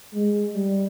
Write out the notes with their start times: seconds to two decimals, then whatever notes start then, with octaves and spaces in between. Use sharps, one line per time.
0.14 G#3
0.54 G3